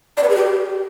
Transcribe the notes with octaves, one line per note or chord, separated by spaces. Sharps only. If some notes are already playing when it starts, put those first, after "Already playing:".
D5
B4
G#4
G4